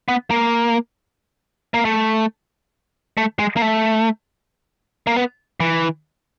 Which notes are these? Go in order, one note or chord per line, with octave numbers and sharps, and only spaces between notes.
B3
A#3
A#3
A3
A3
G#3
A#3
A3
A#3
B3
E3